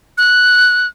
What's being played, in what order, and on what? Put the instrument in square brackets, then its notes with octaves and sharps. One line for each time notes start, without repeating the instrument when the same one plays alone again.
[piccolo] F#6